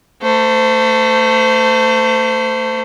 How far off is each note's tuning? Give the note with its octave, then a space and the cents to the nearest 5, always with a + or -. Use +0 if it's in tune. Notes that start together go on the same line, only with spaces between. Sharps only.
A3 +25 C5 -25